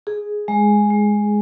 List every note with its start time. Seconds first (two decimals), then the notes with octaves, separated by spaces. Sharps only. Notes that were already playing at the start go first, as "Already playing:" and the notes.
0.07 G#4
0.48 G#3
0.90 G#3